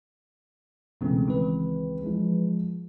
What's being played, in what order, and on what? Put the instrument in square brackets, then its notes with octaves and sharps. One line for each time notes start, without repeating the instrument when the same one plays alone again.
[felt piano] C#2 C4 [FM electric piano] B2 E3 A3
[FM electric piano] D#3 E3 B4
[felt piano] F3 G#3